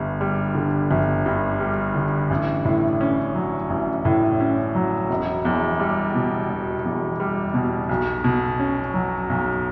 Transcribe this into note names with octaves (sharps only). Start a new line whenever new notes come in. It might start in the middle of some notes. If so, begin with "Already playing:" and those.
Already playing: G1 G2
G3
D3
G1
G2
G3
D3
A1
A2
C#4
F#3
A1
A2
C#4
F#3
E1
E2
G3
B2
E1
E2
G3
B2
B1
B2
C#4
F#3
B1